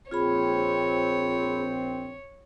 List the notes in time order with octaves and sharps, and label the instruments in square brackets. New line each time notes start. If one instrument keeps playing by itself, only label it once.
[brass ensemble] A#1 C4 [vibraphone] F4 G#4 B5 [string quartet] C#5